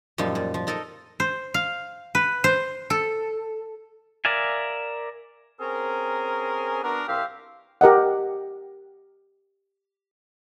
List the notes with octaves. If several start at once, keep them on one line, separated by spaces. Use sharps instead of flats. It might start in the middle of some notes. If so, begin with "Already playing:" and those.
F#2 A#2 F3 G3 D#4
A#2
F3
D#4 A4 A#4 D#5
C5
F5
B4
C5
A4
A#4 D5 E5 F5 G#5
C4 C#4 G#4 A#4
B3 D4 F#4 A#4
C2 G4 C5 E5 F5
G4 A#4 D#5 F#5